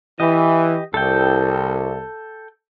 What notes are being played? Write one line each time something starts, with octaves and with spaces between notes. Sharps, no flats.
E3 G4 D#5
C2 A4 G5